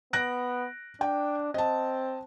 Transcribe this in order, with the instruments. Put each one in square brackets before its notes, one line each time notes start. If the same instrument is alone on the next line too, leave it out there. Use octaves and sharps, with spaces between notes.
[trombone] B3 [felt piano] F#6 A#6 D7
[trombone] D4 [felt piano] G5
[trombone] C4 [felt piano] D#5 A5